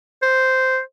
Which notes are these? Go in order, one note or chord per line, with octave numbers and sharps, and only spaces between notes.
C5